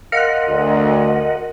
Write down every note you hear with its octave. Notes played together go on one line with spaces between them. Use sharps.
A#4 D#5 F5 F#5 C6 F#6
D2